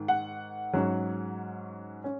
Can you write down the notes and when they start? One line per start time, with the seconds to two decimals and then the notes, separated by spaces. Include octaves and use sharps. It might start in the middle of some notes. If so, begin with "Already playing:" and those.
Already playing: G#2 D#3
0.08 F#5
0.73 G#2 F#3 C#4
2.04 C#4